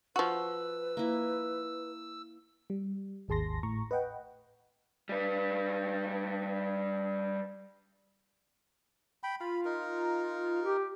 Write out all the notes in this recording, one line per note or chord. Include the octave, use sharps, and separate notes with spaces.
F3 F#4 B4 E6
A#3 E4
G3
G#1 D#2 G#4 A5 C6 A#6
A2 A#5 C#6
B4 D#5 F#5 G5
G3 B4
G5 B5
F4 B5
D#4 A#4
G4